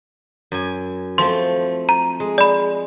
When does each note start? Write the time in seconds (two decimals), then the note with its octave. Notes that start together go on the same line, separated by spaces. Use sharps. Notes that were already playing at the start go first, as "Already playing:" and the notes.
0.52 F#2 G#5
1.18 F3 A3 C4 C6
1.89 A#5
2.20 G#3
2.38 D5 B5